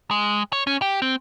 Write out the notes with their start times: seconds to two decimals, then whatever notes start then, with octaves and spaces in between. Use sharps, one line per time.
0.11 G#3
0.53 C#5
0.67 C#4
0.82 G4
1.02 C4